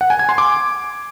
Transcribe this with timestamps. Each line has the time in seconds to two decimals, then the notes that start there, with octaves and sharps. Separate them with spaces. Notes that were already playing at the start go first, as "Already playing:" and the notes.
0.01 F#5
0.10 G#5
0.19 G#6
0.29 C6
0.38 D6